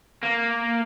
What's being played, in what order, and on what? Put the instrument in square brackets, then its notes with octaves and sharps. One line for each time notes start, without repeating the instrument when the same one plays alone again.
[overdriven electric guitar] A#3